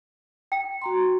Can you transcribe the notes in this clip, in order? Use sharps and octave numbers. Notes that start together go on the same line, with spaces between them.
G5
F#4 A#5 C6